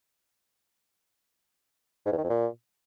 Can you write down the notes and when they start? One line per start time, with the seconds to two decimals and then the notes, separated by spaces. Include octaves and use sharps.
2.06 G#2
2.12 E2
2.18 D#3
2.24 F2
2.30 A#2